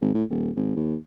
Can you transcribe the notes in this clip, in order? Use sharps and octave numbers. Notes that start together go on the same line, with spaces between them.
G#1
A2
D#1
G#1
D#2